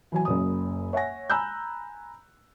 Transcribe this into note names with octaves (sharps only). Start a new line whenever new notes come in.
E3 F#3 G#5
F#1 F#2 D#6
C#5 E5 F#5 G#5 A#6
G#5 A#5 B5 E6 F#6 G6